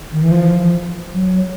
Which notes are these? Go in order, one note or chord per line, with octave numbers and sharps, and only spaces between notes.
D#3
E3
F3
F#3